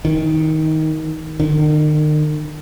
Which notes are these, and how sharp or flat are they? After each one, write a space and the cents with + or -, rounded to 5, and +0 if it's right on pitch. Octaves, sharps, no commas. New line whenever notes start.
D#3 +15
D#3 -40